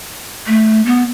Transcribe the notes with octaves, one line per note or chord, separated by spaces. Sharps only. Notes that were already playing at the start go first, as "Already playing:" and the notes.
A3
B3